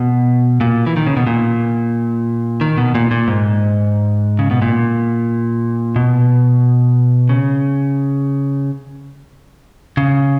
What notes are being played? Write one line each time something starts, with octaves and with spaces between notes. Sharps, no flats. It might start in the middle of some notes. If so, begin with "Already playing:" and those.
Already playing: B2
A#2
E3
D#3
C#3
B2
A#2
D#3
B2
A#2
A#2
G#2
C#3
B2
A#2
B2
C#3
C#3